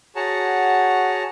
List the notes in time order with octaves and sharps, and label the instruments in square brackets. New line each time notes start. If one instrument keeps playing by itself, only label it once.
[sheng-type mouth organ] F#4 G#4 C#5 F#5 A5 A#5